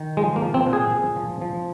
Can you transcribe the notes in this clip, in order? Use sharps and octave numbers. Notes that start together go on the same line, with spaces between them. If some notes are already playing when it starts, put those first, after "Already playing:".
Already playing: D#3
F3 G#3
A#3
F3
C4
A#2
G#4
A#2
F3
F3